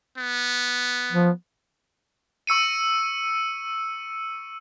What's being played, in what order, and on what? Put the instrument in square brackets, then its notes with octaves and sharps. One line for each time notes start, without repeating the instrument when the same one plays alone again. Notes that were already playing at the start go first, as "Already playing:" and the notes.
[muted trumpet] B3
[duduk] F3
[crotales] C#6 E6 C#7 D#7